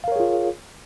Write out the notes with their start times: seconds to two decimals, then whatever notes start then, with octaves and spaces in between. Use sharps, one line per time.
0.04 F5
0.08 A#4
0.12 C#5
0.16 G#4
0.20 F4